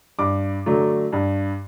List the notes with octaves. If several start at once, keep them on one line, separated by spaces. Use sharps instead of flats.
G2 D6
D3 F#3 A3
G2